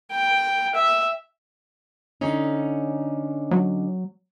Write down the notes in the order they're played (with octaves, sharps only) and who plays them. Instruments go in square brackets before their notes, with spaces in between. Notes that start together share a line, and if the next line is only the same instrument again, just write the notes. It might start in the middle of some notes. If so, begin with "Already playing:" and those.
[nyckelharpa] G5
E5
[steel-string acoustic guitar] D3 C#4 D#4
[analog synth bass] F#3